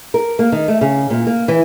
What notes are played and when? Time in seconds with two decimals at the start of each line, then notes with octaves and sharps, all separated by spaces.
0.14 A#4
0.39 A#3
0.52 D#3
0.68 A3
0.81 C#3
1.10 A#2
1.27 A#3
1.48 E3